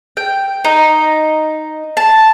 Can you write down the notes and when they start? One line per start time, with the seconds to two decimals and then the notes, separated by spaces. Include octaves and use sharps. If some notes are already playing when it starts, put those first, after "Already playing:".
0.17 G5
0.65 D#4
1.97 A5